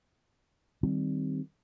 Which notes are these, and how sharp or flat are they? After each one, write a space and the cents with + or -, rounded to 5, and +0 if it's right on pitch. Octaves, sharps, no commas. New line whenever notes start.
D#3 +0 G3 +0 C4 +0